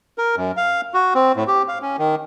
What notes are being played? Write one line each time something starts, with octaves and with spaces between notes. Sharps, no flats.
A#4
F#2
F5
F#4
C4
A2
G4
F5
C#4
D#3